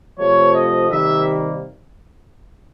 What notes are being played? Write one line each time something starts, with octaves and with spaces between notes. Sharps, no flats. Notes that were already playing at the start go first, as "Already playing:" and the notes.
C3 F3 A3 C#5
D#5
C3 D#3 G3 A#3 E5